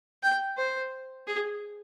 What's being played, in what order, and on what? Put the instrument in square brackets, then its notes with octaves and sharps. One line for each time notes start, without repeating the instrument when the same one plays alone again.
[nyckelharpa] G5
C5
G#4